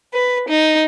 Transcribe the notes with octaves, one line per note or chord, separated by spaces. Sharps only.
B4
D#4